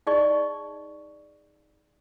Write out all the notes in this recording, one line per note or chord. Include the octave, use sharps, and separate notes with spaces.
D#4 G#4 D5 D#5 C#6